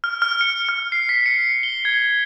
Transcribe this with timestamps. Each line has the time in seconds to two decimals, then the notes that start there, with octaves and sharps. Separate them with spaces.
0.04 F6
0.22 F6
0.41 C#7
0.69 F6
0.92 C7
1.09 B6
1.26 C#7
1.63 G7
1.85 G#6